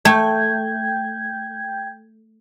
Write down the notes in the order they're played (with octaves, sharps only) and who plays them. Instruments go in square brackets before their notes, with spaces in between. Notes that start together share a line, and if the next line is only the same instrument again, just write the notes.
[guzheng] A3 [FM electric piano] G5 G6 G#6